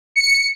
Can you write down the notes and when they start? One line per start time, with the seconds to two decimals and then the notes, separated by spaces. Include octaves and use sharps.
0.16 C#7